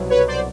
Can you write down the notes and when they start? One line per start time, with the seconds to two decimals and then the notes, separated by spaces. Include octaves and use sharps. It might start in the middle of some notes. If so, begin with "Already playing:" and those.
Already playing: C2 B2 F#3
0.10 B4 C#5
0.28 C5 D5